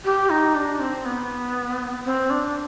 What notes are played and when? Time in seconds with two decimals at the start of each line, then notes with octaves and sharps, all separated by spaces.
0.05 G4
0.30 D#4
0.55 D4
0.80 C4
1.05 B3
2.05 C4
2.30 D4